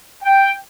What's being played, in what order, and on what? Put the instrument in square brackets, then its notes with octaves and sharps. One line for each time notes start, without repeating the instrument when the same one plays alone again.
[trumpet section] G5